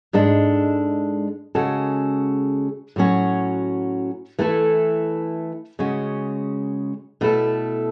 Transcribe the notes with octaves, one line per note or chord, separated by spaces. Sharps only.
G#2 G#3 D4 A4
C#3 G#3 C#4 F#4 A4
A2 F#3 C#4 F#4
E3 A3 E4 A4
C#3 G#3 C#4 F#4
B2 A3 E4 A4